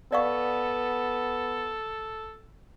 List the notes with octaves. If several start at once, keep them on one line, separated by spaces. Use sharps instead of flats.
B3 A4 D5 F5 C#6